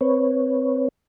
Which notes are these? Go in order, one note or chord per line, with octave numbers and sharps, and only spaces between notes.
C4 B4 C#5